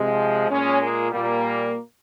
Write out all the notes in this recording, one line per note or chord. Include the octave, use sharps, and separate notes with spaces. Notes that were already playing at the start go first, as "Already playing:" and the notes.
Already playing: C3 F3 G#3
A#2 G#3 C#4
A#3
A#2 G3 A#3